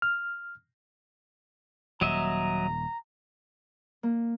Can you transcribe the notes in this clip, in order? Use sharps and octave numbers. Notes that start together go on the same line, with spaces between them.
F6
D#1 F#3 D#5 E5 A#5
A#3